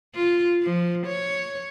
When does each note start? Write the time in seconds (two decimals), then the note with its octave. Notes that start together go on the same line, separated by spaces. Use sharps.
0.15 F4
0.63 F3
1.06 C#5